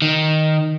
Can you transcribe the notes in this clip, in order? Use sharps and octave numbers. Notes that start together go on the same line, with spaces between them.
D#3